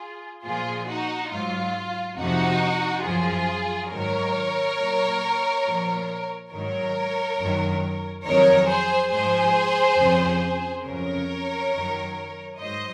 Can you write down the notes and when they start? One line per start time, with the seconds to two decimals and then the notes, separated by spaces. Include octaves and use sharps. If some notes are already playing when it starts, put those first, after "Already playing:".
Already playing: F4 G#4
0.44 A#2 F3 F4 G#4
0.88 D#4 F#4
1.31 G#2 F#3 F4
2.18 F2 C3 F3 D#4 F#4
3.05 F#2 F3 F4 G#4
3.91 G#2 D#3 F#3 A#4 C#5
4.79 A#2 F#3
5.65 A#2 F3
6.51 G#2 D#3 F#3 A#4 C#5
7.39 F#2 D#3 F#3
8.26 F2 D#3 F#3 A#4 C#5
8.69 G#4 C5
9.13 G#2 F3 G#4 C5
9.99 F2 C#3 F3
10.85 F2 C#3 F#3 A#4 C#5
11.73 F#2 D#3 F#3
12.60 G#2 F#3 C5 D#5